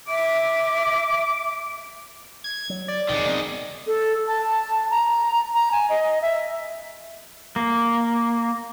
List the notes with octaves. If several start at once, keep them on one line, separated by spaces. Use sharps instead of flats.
E5 D6
G#6
F#3
D5
B1 F2 D3 D#3 G#3
F1 B3 C4
A4
A5
A#5
A#5
G#5
D#5
E5
A#3